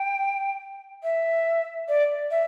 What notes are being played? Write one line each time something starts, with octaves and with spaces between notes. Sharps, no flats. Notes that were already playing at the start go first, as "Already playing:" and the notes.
Already playing: G5
E5
D5
E5